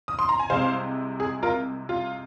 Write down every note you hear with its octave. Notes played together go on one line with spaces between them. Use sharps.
D#6
C6
A#5
G#5
C2 C3 G#3 C5 F5
G#4
F4 A#4
F4